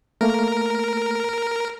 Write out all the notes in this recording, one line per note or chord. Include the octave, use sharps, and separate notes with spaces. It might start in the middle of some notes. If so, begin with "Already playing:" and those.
A3 A#3 A#4